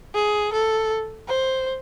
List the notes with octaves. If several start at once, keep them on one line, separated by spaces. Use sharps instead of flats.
G#4
A4
C5